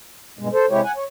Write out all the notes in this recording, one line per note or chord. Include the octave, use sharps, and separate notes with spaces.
G2 B2 G#3
A4 C5
C3 G#3 E4 G4 C#5
F#5 G#5
C#5